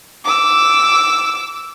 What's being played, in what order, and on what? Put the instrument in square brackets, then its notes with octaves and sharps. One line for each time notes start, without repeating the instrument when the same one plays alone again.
[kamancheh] D6 E6